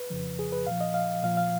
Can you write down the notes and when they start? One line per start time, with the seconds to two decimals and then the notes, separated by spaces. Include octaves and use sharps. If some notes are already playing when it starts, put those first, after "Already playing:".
Already playing: B4
0.10 F2 C#3 F3
0.39 G#4
0.52 B4
0.67 A#2 F3 F5
0.81 D#5
0.94 F5
1.23 A#2 F3 F5
1.37 F5